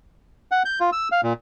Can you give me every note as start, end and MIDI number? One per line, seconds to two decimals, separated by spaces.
0.51 0.63 78
0.65 0.79 91
0.80 0.90 65
0.92 1.08 88
1.12 1.21 77
1.23 1.33 46